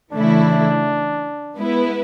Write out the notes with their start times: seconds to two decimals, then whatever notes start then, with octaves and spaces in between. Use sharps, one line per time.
0.12 C#3 E3 A3 D4 E4
1.57 G#3 B3 E4 B4